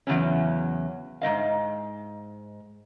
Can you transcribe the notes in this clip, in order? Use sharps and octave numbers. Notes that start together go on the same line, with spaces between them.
E2 C#3 F#3 C#4
G#2 A3 D#5 F5